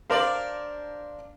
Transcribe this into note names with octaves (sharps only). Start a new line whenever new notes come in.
D4 A#4 C5 D5 F5